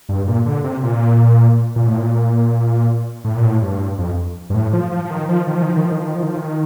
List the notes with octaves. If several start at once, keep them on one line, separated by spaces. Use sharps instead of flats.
G2
A#2
D3
C3
A#2
A#2
A2
A#2
A2
A#2
A2
G2
F2
G2
A2
F3
F3
F3
D#3
F3
D#3
F3
D#3
F3
D#3
F3
D#3
F3
D#3
F3
D#3
F3
D#3